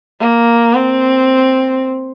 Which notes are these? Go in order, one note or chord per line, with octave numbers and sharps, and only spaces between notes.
A#3
C4